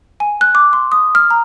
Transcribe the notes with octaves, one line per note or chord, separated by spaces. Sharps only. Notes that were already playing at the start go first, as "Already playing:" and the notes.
G#5
F#6
D6
C6
D#6
F6
A#5